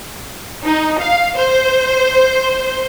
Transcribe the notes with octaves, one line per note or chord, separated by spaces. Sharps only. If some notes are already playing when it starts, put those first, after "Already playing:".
D#4
F5
C5